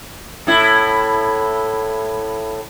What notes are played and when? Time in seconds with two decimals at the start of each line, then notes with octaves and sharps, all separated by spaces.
0.47 A2 E4